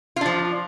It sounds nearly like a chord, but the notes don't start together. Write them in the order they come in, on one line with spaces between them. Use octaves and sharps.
F4 D4 F3